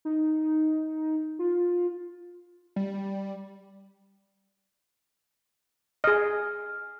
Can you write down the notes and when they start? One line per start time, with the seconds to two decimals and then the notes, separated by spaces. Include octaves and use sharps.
0.05 D#4
1.39 F4
2.76 G3
6.04 G#4 D#5 F6